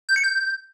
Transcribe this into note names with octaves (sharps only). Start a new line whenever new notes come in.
G6
C#7
G6